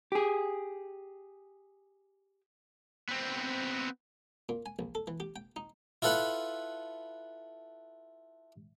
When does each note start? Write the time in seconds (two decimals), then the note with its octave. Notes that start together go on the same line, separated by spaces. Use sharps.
0.12 G4 G#4
3.09 B3 C4
4.49 A#2
4.66 G#5
4.79 A#1
4.95 A4
5.07 E3
5.20 G4
5.36 G5
5.56 D#4
6.02 E4 F4 A4 B4 F#5